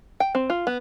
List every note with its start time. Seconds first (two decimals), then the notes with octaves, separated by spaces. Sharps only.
0.20 G5
0.35 C4
0.50 F4
0.67 B3